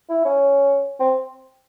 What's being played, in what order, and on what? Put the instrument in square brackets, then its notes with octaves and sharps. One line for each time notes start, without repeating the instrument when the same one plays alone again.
[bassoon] E4
C#4
C4